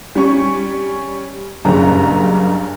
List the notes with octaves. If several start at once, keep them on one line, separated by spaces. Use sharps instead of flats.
G3 C#4 C#6
F#1 G2 C#3 A#5